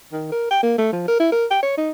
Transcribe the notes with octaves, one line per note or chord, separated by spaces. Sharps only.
D#3
A#4
G5
A#3
A3
F3
A#4
E4
A#4
G5
C#5
D#4